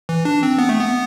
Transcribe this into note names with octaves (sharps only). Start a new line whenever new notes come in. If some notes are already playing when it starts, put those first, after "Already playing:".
E3
D4
C4
B3
A3
B3